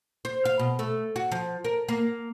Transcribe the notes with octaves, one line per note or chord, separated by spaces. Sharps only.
C5
F5
B2
A3
F#4
F3
A#4
A#3